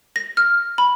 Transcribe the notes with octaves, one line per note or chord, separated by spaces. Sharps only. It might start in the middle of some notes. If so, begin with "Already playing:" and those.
A#6
F6
B5